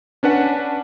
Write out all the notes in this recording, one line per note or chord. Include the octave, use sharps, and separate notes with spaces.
C#4 D4 B4 F#5